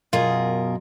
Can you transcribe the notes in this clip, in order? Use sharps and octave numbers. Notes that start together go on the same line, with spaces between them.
F#2 B2 F4 G#4 A#4